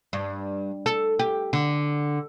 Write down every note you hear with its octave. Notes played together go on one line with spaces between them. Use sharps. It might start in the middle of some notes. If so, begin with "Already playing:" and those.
G2
A4
G4
D3